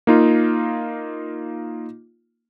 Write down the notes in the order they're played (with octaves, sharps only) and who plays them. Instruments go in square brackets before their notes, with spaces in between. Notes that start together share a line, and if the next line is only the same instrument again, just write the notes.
[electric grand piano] A#3 D#4 F4